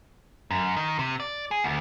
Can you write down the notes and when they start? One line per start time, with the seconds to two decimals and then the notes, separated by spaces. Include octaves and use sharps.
0.51 F#2
0.77 D#3
0.99 C3
1.20 D5
1.51 G#4
1.64 D2